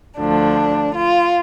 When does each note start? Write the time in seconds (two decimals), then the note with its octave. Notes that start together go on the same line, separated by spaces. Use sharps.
0.19 D2 D3 F3 D4
0.94 F4